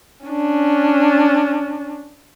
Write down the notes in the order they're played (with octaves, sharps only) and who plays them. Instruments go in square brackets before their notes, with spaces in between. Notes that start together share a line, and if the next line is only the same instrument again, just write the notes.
[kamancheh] C#4 D4